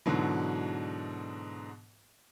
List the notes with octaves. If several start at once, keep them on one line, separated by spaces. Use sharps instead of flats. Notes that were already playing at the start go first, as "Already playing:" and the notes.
G#2 B2 D3 E3 F#3